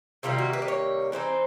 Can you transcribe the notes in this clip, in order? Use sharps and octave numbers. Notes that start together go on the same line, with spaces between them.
C3 D#3 G3 A#3 F4
F#4
B4
D5
C#5
E3 A3 C4 D#4 C5